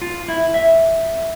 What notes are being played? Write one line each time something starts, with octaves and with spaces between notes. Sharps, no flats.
F4
E4
E5